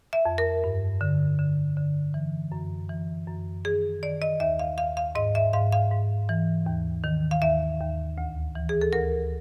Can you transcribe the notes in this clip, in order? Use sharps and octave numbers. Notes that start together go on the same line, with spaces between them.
E5
F2
A#4
G2
D3
D3
D3
E3
F#2
E3
F#2
D#3 G#4
D#3 D5
D#5
D#2 E5
F5
D#2 F5
F5
G#2 D#5
E5
G#2 F5
F5
G#2
E3
D#2
D#3
F5
D#2 E5
D#2
D2
E3
G#4
A4
D2 A#4